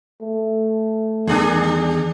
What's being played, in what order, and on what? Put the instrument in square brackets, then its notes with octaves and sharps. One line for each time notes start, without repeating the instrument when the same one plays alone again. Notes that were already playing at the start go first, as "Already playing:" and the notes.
[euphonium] A3
[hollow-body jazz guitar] E2 D#3 [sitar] G3 D4 G#4